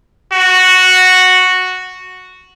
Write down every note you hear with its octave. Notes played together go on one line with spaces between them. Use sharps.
F#4